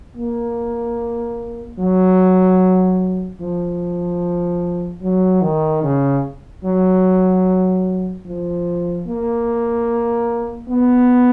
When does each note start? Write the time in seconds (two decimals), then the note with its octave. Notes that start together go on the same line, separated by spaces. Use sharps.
0.17 A#3
1.78 F#3
3.40 F3
5.02 F#3
5.42 D#3
5.83 C#3
6.64 F#3
8.26 F3
9.07 A#3
10.68 B3